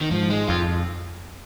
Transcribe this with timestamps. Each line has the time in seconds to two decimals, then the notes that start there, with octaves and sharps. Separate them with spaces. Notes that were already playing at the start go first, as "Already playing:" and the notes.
0.01 D#3
0.11 G#2 F3
0.30 G#3
0.48 F2 F4